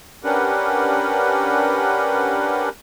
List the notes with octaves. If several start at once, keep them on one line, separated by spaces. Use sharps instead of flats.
C#4 D4 G4 A#4 B4 F#5